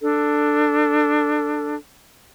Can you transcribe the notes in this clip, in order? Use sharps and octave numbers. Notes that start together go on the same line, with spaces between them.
D4 A4